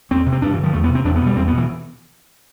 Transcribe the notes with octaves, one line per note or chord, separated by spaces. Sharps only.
E2 C4
C3
C4
G2 D4
E3
D3
F3
E2 A3
B3
C3
C4
E2 D4
B3
B2
G3
E2 C4
B2 B3
E3